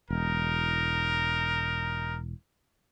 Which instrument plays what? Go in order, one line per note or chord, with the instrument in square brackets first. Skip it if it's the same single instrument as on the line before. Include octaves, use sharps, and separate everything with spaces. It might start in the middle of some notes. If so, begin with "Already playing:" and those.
[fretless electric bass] E1 [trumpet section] D#4 A#4